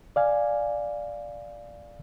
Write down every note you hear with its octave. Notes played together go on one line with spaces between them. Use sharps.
D5 F5 G#5